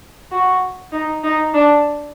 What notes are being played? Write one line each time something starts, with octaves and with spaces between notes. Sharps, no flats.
F#4
D#4
D#4
D4